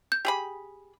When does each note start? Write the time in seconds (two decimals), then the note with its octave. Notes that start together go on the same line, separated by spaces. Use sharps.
0.12 G6
0.25 G4 G#4 B5